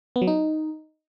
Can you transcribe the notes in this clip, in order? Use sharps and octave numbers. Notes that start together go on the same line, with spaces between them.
B3
F#3
D#4